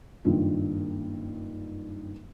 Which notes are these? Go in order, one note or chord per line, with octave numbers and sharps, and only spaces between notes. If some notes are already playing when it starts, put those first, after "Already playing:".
F#1 G2 D#3 F4